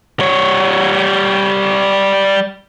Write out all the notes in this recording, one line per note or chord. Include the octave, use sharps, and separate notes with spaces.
G3 C#5